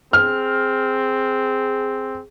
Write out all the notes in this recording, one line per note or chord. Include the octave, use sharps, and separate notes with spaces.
C4 G#4 F6